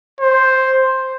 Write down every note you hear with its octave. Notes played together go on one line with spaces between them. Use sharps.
C5